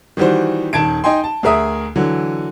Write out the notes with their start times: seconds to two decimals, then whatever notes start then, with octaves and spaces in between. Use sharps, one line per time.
0.17 D#3 E3 G3 F#4 C5
0.73 D#1 D#3 A5 G#6 D7
1.04 D#4 D#5 G5 G#5 C6
1.24 A5
1.43 D2 G#4 A#4 E5 D#6
1.96 D3 E3 F#3